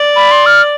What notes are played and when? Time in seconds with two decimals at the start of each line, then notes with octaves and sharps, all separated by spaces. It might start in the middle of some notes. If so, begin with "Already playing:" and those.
Already playing: D5
0.16 B5
0.31 C6
0.46 F6